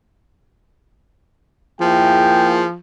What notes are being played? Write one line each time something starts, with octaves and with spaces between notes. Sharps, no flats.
F3 A#3 E4 G#4 G5